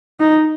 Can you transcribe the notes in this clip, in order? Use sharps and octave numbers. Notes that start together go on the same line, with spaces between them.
D#4